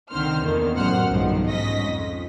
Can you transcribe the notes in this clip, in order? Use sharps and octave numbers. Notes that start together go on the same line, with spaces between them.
C2 D3 D#3 C4 C5 F6
E2 A#2 D3 D#3 A#3
A1 F#2 C5 F#5 F6
B1 G2 D#3 F3
G#2 C#4 D#5 A#6 B6
F2